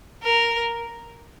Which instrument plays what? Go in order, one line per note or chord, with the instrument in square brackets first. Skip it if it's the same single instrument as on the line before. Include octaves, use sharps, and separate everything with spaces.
[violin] A#4